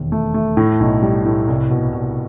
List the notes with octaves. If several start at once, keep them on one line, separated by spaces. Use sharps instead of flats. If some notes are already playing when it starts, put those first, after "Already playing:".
Already playing: E1 D#2
A3
A3
A2
B1
G3
A2
C2
B2
C2